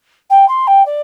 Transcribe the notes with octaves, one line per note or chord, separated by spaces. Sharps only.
G5
C6
G5
D5